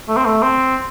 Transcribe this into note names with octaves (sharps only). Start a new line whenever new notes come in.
A3
C4
A3
C4